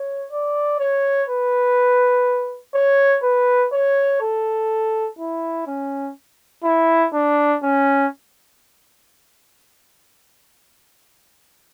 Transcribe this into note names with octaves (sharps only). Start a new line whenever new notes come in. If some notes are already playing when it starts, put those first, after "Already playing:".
Already playing: C#5
D5
C#5
B4
C#5
B4
C#5
A4
E4
C#4
E4
D4
C#4